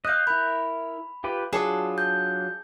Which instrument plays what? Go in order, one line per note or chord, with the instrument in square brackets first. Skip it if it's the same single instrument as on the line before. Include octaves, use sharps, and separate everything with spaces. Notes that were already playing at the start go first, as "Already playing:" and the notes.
[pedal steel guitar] D#5 F5 [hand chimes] F#6 G6
[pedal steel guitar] E4 A#4 [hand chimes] B5
[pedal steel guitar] F4 G4 B4
[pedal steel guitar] F#3 D4 F4 [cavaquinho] G#4 A4 D5
[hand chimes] G6